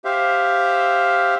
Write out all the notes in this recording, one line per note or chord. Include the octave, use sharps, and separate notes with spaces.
G4 C5 E5 F5